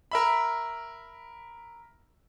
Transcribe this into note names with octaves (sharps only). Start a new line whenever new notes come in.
A#4 E5 B5